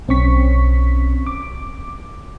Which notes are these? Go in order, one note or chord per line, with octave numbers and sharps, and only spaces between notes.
B1 C4 C#4 C#6 B6
D6